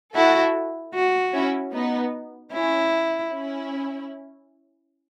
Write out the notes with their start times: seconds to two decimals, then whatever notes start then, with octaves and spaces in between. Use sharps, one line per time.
0.15 E4 F#4 A4
0.95 F#4
1.34 C#4 E4
1.74 B3 D#4
2.53 C#4 E4
3.32 C#4 E4